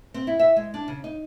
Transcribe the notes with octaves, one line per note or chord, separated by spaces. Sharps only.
C4
E4
E5
G#3
D4
C#3
D#4